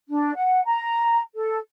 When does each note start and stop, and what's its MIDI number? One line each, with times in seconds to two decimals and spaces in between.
0.10 0.35 62
0.36 0.61 78
0.65 1.20 82
1.35 1.57 69